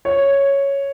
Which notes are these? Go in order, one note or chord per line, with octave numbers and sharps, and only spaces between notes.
C#5